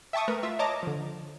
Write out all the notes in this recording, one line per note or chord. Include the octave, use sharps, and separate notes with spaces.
E5 G5 A5 C#6 D#6
A3 A#4 B4
F4 E5
C#5 D#5 A5 A#5 D6
D3 F3